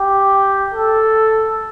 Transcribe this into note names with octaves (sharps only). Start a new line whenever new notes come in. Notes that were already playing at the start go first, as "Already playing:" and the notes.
Already playing: G4
A4